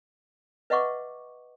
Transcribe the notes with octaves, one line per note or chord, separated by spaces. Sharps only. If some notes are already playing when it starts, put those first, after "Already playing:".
B4 D#5 E5 F#5 C#6 D6